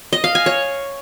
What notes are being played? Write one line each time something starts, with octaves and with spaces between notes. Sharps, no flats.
D#5
F5
G#5
C#5